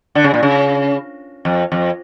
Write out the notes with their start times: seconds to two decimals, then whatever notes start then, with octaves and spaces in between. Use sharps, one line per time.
0.15 D3
0.24 C#3
0.34 A#2
0.43 C#3
1.45 F2
1.72 F2